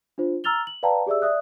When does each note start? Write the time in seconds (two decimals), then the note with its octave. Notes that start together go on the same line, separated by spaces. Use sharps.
0.18 D4 F4 C5
0.44 A#5 E6 F6 A6 F7 G7
0.67 F#7
0.83 B4 D5 F5 G5 A5 A#5
1.07 G4 G#4 D5 E5 E6
1.22 D5 E5 D#6 F#6